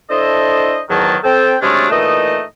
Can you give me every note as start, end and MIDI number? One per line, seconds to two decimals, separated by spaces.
0.09 0.79 62
0.09 0.79 64
0.09 0.79 69
0.09 0.79 72
0.09 0.79 75
0.90 1.16 40
0.90 1.16 44
0.90 1.16 51
0.90 1.16 54
0.90 1.16 81
1.23 1.55 60
1.23 1.55 69
1.23 1.55 79
1.62 1.86 48
1.62 1.86 54
1.62 1.86 56
1.62 1.86 57
1.62 1.86 61
1.62 1.86 62
1.90 2.42 46
1.90 2.42 52
1.90 2.42 57
1.90 2.42 63
1.90 2.42 75